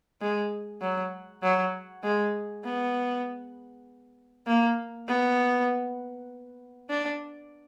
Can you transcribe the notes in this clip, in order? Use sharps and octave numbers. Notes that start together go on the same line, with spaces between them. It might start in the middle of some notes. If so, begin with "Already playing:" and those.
G#3
F#3
F#3
G#3
B3
A#3
B3
D4